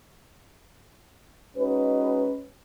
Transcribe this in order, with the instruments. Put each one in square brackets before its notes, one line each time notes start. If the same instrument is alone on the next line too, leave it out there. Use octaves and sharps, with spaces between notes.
[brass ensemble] G#3 C#4 D#4 F#4 B4